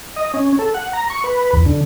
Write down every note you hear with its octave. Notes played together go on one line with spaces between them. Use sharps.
D#5
C#4
A4
F#5
A#5
C#6
B4
E2
D3